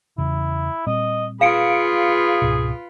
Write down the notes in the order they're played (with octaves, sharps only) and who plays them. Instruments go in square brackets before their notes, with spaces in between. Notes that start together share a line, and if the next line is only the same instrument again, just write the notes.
[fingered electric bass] E2 C#3 [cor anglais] E4
[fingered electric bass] A#2 G3 C4 [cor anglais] D#5
[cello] F4 B4 [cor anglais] G#4 [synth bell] F5 C#7 D7
[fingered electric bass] C#2 G#2 B2